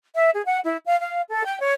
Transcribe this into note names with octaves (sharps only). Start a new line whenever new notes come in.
E5
G#4
F#5
E4
F5
F5
A4
G5
C#5